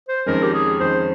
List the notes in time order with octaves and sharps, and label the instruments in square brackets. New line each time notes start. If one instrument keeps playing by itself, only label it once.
[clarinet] C5
[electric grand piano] F2 D#3 G#3 C#4 [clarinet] A#4
[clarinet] G4
G#4
[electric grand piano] F2 D#3 G#3 C#4 [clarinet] C5